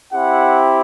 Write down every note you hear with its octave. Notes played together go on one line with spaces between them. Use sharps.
C4 E4 G4 F#5